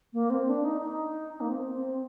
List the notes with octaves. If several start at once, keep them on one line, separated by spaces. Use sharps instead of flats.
A#3
C4
D4
D#4
D#4
A#3
C4
C4